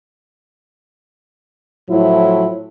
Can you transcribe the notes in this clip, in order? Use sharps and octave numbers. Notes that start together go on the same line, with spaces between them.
A2 F3 F#3 E4